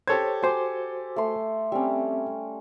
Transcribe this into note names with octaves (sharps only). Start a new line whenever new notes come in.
G4 A4 C5 C#5 G#6
F#4 C5 G#5 C6 D6
A3 C6
G3 C4 C#4 E5